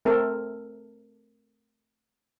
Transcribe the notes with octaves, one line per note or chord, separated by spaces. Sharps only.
A3 C4 A4 A#4